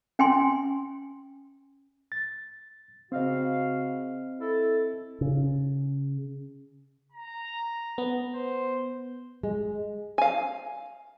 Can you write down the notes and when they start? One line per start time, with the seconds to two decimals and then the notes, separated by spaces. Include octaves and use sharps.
0.19 C#4 G5 G#5 C6
2.12 A6
3.12 C#3 C4 F#4 D#5 F5
4.41 E4 A4
5.21 C#3
7.13 A#5
7.98 B3
8.35 C5
9.43 G#3
10.18 F5 G#5